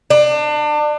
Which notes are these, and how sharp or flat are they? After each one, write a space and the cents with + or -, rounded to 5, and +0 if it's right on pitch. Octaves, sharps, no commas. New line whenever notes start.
D4 +30